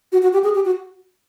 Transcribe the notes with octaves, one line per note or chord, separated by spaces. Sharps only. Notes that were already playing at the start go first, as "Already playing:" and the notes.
F#4
F#4
G4
G#4
G4
F#4